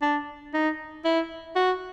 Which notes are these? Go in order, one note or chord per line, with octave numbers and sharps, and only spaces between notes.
D4
D#4
E4
F#4